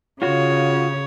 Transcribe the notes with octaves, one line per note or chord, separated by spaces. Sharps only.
C#3 F4 F#4 C#5